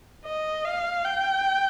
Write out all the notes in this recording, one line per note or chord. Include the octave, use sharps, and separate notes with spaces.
D#5
F5
G5